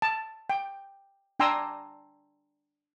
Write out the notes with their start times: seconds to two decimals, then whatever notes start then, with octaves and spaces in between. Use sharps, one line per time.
0.02 A5
0.50 G5
1.40 D4 G5 G#5 A#5 C6 E6